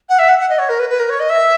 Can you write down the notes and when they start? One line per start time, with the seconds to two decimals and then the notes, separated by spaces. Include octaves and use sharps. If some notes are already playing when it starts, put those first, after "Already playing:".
0.09 F#5
0.18 E5
0.28 F#5
0.38 F#5
0.49 D#5
0.58 C#5
0.69 A#4
0.79 B4
0.89 B4
0.99 A#4
1.09 C#5
1.19 D#5
1.29 E5